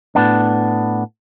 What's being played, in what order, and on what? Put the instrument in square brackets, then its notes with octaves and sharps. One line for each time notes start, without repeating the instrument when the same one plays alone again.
[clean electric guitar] A2 B3 D4